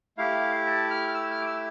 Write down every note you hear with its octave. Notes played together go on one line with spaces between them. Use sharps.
A3 E4 G4 F5
A5
F6
F6
E6
F6
D6
E6